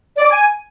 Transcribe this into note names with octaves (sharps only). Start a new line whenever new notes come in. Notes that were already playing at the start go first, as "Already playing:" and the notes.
D5
D6
G#5